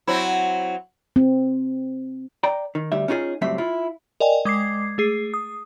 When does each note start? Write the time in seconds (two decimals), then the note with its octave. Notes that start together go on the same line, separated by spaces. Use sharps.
0.07 F#3 C4 E4
1.16 C4
2.43 D5 G5 A#5
2.75 D#3
2.92 D2 G3 E5
3.08 C#4 D#4 F4 F#4 G#4
3.41 C#2 F#2 A2 G3 C4 E5
3.58 E4 F4
4.20 A#4 D5 D#5 G5 G#5
4.45 G#3 D6 G#6 C7
4.98 A3 G#4 C7
5.34 D#6